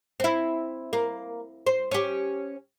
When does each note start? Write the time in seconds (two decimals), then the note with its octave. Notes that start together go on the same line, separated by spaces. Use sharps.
0.20 C4 E4
0.93 A#3
1.66 C5
1.91 C#4 G4